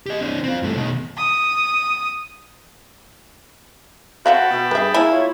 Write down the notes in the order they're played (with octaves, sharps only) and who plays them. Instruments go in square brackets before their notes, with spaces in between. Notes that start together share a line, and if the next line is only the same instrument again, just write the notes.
[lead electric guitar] G4 D#5
C4 D4
C4 F4
G2 A3
B2 D#3
[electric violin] D#6
[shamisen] F3 E5 F5 [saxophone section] F#4 [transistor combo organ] G5 A5 B5
[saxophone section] B2
[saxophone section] G2 G#4 [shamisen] B4 E5
[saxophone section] A#3 [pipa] E4 [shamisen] G#4
[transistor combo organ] F4 C#5